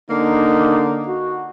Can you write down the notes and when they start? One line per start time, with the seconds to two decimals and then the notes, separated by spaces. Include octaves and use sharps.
0.11 D3 A#3 D#4
1.08 F#4